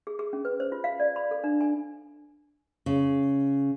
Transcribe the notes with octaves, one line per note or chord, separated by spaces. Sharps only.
G#4
G#4
C#4
B4
C5
F4
F5
D5
B5
A4
D4
G#5
C#3